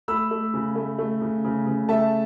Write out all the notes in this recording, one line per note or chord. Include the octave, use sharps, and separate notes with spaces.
A3 B5 E6
A3
C#3
A3
A3
C#3
C#3
C#3
A3 E5 A5